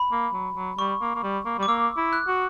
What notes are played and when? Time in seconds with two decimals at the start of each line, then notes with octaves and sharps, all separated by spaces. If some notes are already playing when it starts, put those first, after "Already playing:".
Already playing: B5
0.12 A#3
0.34 F#3
0.56 F#3
0.78 G3 C#6
1.01 A#3
1.15 A#3
1.23 G3
1.46 A#3
1.59 G3 D6
1.68 A#3 E6
1.97 E4
2.13 F#6
2.28 F#4